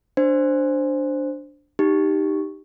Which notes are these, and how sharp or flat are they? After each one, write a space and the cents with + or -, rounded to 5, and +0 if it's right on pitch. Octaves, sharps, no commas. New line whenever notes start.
D4 +0 C5 +0
D#4 -5 G4 +0